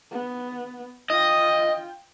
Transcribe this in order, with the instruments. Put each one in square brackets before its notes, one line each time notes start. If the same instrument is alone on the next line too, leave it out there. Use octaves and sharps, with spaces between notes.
[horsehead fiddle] B3
[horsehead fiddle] F4 G5 [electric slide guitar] D#5